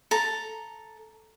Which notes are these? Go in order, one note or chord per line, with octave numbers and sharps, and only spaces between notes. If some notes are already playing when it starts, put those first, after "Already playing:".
A4 A#5